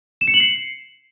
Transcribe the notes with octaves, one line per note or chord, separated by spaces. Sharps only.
E7
C#7
F#7
C7